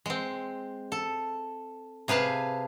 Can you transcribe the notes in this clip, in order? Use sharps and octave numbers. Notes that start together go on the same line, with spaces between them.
G#3 C4
A4
C3 G#4 B4 F5 A5